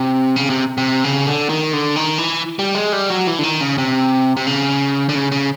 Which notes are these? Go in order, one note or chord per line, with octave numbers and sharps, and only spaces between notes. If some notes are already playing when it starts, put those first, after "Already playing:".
Already playing: C3
C#3
C3
C3
C#3
D3
D#3
D3
D#3
E3
G3
G#3
G3
F#3
E3
D3
D#3
C#3
C3
C3
C#3
D3
C#3
C#3